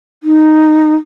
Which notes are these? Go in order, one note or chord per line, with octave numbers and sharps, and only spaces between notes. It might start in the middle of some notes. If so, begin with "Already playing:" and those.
D#4